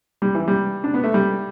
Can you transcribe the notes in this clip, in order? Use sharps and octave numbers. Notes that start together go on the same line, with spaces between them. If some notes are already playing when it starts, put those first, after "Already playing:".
G3
E3
G3
D4
B3
A3
G3